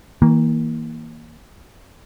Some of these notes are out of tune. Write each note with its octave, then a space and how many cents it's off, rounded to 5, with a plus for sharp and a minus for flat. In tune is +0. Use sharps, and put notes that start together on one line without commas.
E3 -40 A#3 +0